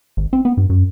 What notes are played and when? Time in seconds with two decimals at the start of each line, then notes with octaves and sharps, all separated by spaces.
0.17 G#1
0.33 C4
0.45 B3
0.57 G2
0.70 F#2